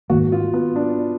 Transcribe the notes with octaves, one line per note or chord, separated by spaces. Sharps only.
G#2 D#3 A#3 F#4
F4
B3
D4